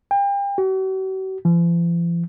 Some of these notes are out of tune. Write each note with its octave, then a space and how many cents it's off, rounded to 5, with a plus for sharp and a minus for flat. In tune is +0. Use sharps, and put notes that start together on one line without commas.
G5 +35
F#4 +45
F3 -45